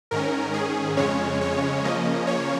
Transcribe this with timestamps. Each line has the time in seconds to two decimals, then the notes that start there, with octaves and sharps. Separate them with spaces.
0.11 G#2 D#3 C#4 A#4
0.54 G#4
0.97 F2 C#3 G#3 C#4 C#5
1.41 C#5
1.84 C#3 F3 A#3 C#4 D#5
2.27 C#5